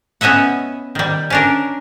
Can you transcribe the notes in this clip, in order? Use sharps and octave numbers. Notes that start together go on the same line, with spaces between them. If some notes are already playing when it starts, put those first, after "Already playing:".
B3 C#4 D#5 E5 F#5
D#3 G3
C#4 D4 A#4